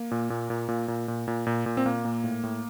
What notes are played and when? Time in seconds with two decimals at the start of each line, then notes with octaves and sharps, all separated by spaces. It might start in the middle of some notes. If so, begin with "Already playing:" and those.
Already playing: A#3
0.11 A#2
0.30 A#2
0.50 A#2
0.69 A#2
0.88 A#2
1.08 A#2
1.28 A#2
1.47 A#2
1.66 A#2
1.77 C4
1.85 A#2 A#3
2.05 A#2
2.24 A2
2.43 A2